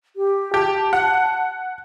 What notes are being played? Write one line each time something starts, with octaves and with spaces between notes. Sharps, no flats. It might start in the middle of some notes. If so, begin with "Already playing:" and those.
G4
G4 A5
F#5